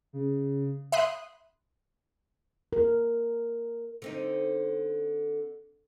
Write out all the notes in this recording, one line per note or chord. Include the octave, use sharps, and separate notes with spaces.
C#3
E5 B5 C6 D#6 F#6
A#4
D3 C4 D#4